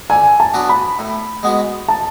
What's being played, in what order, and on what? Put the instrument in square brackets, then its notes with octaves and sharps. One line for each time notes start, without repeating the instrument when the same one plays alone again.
[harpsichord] D3 [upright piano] G#5
[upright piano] A5
[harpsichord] F#3 B3 D4 F#4
[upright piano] B5
[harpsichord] A2
G#3 B3 F#4
[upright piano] A5